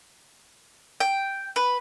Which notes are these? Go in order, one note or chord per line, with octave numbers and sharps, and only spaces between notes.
G5
B4